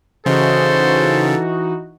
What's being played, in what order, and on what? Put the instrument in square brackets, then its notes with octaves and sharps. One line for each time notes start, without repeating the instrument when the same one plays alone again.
[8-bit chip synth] C#3 [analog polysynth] E3 D#4 F#4 [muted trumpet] A4 [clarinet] C5